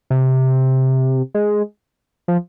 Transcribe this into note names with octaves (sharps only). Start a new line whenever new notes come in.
C3
G#3
F3